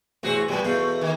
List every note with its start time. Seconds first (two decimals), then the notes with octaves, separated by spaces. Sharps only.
0.23 A1 E2 C4 F#4 G#4 C#5
0.49 A#2 F3 G3 B3
0.64 E2 B2 A3 F4
1.01 D#3 A#3